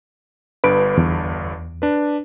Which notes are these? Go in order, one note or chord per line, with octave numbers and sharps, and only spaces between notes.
G1 G2 B4 D7
E2
D4 B4